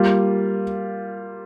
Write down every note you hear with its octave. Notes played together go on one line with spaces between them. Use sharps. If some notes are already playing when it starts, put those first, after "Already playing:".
Already playing: G3 A#3 F4